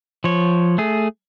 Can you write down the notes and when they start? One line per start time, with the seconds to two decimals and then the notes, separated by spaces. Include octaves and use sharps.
0.24 F3 C#5
0.78 A3 G#4